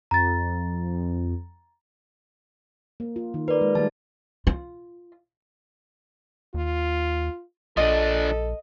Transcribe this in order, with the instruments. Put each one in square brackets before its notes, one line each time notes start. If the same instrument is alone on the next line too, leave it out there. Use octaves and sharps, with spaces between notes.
[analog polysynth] F2 [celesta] A#5 A6
[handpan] A#3
F4
D#3
[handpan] A#4 [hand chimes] B4 D5
[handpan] G#3
[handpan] D#3 G3 A3 [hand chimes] A5
[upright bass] F4
[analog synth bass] D#2 [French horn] F4
[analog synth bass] A#1 [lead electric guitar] F3 D4 [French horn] A4 [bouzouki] D#5